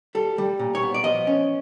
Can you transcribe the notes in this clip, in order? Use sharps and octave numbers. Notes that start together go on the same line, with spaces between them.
G3 A4
G3
A#2
C#5
B3
D5
F3 D#5
C#4